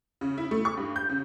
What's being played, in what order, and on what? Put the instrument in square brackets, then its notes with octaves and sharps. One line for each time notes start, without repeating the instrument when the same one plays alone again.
[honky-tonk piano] C#3
E4
A3
C#6
G2
G6
C#3